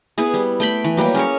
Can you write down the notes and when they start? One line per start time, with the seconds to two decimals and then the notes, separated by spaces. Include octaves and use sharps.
0.18 B3 E4 G#4
0.34 G3
0.60 A3 G5 B5
0.84 E3
0.97 F#3 G3 A#3 G4
1.15 C#4 G#4 A#4 C#5